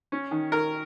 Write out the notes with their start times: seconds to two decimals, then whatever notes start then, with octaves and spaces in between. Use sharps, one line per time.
0.12 C#4
0.31 D#3
0.52 D#3 A#4